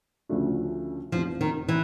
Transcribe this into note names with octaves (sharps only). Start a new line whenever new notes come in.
D2 C#3 F3 A3 D4
F1 E2 C3 F3
D#3
E3